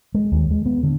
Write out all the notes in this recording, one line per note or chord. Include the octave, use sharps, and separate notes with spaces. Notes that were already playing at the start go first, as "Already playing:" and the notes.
G#3
D#2
G#3
B3
D3